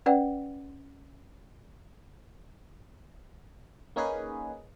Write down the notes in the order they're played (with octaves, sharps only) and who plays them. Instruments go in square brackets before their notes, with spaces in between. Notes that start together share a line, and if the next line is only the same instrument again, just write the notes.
[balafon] C#4 B4 D5 F#5 G5
[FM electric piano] A#3 C#4 D#4 G#4 B4